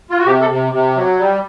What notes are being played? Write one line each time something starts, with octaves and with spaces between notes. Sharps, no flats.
F4
F#4
C3 G4
A4
C3
C3
F#3
G3